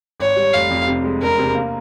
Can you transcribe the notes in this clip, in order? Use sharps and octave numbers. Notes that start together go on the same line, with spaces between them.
G#1 C#5
G3
F1 F5
F2
C3
G#3
E1 A#4
C3
A#3